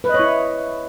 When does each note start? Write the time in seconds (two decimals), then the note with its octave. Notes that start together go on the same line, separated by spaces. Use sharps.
0.04 B4
0.09 D#5
0.14 C#5
0.19 E4